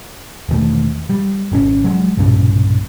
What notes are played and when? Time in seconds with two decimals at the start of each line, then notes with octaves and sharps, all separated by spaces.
0.49 E1 D#3 A3
1.10 G3
1.52 G#1 C#3 C#4
1.84 F#3 G#3
2.17 B1 G2 A#2 C#3